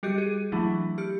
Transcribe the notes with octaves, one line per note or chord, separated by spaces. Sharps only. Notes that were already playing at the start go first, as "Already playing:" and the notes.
G3 F#4 G4 D#5 G6
G#4 D#7
E3 F#3 A3 D4 E4
G4 F6 C#7